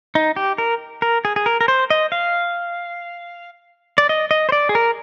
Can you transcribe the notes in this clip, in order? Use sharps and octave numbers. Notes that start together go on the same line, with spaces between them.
D#4
G4
A#4
A#4
G#4
G#4
A#4
A#4
C5
D#5
F5
D5
D#5
D#5
C5
D5
G#4
A#4